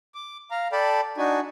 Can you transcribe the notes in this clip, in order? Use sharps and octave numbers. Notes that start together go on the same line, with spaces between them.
D6
F5 A#5
A4 D5 G5 A5 B5
D4 D#4 F#4 G#5